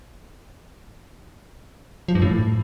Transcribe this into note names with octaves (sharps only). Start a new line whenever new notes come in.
F3
G2
A2